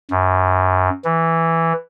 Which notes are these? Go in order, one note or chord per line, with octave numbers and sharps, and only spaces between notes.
F#2
E3